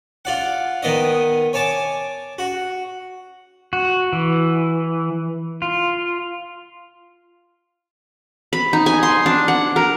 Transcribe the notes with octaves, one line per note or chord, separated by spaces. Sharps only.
F4 D5 F#5
D#3 B3 D5 D#5
C#5 G#5 A5 D6
F#4
F#4
E3
F4
B5
D#4
G#5
C6
D4
F#5
A#4